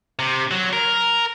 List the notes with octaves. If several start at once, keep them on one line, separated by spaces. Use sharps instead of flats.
C3
F#3
A#4